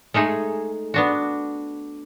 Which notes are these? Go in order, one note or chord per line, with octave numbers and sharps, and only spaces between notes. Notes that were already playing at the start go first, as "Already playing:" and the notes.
G#3 A3 D#4 G#4
B3 D4 F#4